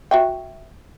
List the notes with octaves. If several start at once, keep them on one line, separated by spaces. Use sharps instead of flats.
F#4 E5 G5